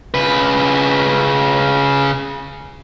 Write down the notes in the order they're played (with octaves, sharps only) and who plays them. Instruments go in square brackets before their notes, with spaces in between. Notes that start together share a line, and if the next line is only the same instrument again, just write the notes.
[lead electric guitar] C#3 B4